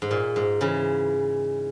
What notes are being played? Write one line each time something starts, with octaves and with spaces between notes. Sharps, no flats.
G#2
A#2
G#2
C#3 E3